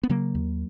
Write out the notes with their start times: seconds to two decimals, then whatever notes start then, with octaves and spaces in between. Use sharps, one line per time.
0.03 B3
0.09 C#3 F#3 A#3
0.35 D#2